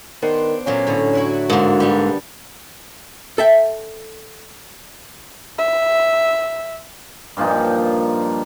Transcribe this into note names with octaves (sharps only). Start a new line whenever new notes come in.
D#3 B3 D4 C5
A#2 F#3 A#3 C#4
A2 D3
F#3 E4 F#4
G#2 D3 A#3 D4
G3 B3
A4 E5 G5
E5
G2 A#2 F3 D#4